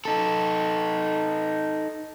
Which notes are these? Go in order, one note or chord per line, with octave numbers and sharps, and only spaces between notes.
D#4 A4